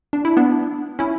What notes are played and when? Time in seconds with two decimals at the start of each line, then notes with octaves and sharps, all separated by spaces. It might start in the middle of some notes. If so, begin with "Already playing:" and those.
0.13 D4
0.25 E4
0.37 B3 D4
0.99 C#4 E4